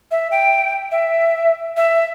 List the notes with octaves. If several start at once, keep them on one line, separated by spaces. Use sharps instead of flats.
E5
G5
E5
E5